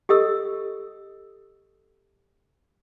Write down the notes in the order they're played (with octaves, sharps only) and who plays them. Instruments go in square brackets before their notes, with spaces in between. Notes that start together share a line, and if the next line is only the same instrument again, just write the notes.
[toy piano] G4 A4 D#5 D#6 E6